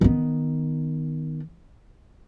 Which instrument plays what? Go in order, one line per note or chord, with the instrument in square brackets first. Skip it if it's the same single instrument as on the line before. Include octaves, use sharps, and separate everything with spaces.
[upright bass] D#3 B3